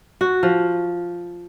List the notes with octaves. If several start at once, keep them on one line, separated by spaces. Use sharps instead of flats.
F#4
F3